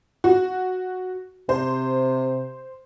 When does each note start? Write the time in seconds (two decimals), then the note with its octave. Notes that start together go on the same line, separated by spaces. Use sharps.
0.24 F#4
1.49 C3 C5